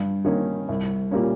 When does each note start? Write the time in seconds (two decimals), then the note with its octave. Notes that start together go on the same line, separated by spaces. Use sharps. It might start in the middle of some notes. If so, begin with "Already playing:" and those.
Already playing: G2
0.25 D#3 A#3 C#4
0.69 C2
1.11 A#2 G3 A#3 C#4